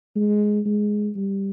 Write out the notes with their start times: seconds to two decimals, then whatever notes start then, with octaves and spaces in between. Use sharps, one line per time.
0.15 G#3
0.66 G#3
1.16 G3